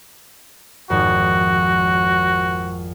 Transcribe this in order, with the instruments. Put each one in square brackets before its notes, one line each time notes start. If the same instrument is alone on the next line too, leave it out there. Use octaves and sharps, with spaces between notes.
[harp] G#1 F2 [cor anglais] F#4